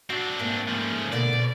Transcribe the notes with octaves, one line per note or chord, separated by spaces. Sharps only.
C4 D4 F#4
G#2 A3 A#3
C#3 F3
B2 D3 A#3 D5
B2